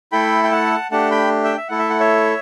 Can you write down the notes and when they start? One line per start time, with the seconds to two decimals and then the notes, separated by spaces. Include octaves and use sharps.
0.12 A3 E4 A4 G5 B5
0.44 G5
0.51 F#5 A5
0.91 A3 D4 G4 F#5 A5
1.11 G5 B5
1.44 E5 G5
1.57 E5
1.68 A3 E4 A4 F#5
1.79 E5
1.90 F#5
2.00 C#5 E5